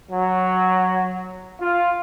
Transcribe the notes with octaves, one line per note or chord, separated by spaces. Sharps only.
F#3
F4